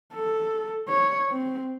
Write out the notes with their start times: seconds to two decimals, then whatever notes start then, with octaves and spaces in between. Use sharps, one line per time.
0.14 A4
0.89 C#5
1.30 C4